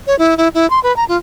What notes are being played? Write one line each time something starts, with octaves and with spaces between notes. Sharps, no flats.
C#5
E4
E4
E4
C6
B4
A#5
F4